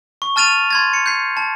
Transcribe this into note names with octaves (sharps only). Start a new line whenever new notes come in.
C#6
A5 F6 A6 D#7 F7
C6 G#6 A6
C#7
G6 C7
A5